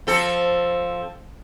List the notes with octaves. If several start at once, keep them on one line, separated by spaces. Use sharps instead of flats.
F3 C4 A4